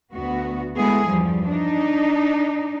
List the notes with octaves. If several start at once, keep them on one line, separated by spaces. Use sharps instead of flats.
D2 B3 F#4
G#3 A3 B3 E4 G#4
E2 G2 F3 G3
D4 D#4